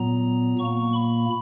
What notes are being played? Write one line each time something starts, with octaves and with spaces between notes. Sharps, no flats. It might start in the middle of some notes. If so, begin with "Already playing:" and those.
Already playing: A#2 F#3 B3 A#5
A#2 A#3 C#6
B5